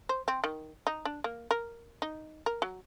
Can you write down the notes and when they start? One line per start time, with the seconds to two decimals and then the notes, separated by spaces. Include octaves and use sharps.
0.09 C5
0.28 C4
0.44 D#3
0.87 D#4
1.05 D4
1.24 A#3
1.51 A#4
2.02 D#4
2.46 A#4
2.62 F#3